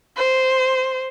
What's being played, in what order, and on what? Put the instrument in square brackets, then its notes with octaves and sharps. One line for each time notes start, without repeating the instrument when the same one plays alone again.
[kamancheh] C5